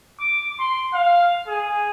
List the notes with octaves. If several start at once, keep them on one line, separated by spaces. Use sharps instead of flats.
D6
C6
F5
G#4